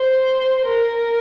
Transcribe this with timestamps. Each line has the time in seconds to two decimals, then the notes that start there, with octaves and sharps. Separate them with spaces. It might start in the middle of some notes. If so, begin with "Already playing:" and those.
Already playing: C5
0.65 A#4